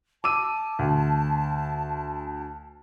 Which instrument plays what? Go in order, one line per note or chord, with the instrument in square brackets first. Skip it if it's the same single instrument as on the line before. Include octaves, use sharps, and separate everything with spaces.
[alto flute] A5 [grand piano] D6 E6 D#7
[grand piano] D2